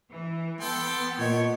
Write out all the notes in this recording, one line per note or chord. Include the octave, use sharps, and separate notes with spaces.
E3
B3 A4 G5 C6
A#2 C#5 D#5 F#5 G#6